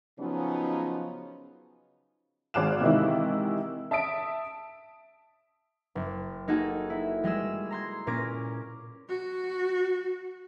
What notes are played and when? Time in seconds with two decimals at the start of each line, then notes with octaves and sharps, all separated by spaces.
0.19 C#3 F3 F#3 B3 C#4 D#4
2.54 G#1 G#4 F5 D6 F#6 E7
2.81 G#2 C3 D#3 E3 D#4 E4
3.91 E5 A5 D#6 B6 D7
5.95 F#1
6.48 A#3 D#4 F#4 G#4 A4
6.90 E4
7.23 G3 G#3 G#4 E6
7.70 A#5 C6 G#6
8.07 A#2 A#3 C#4 D6 A#6 D7
9.09 F#4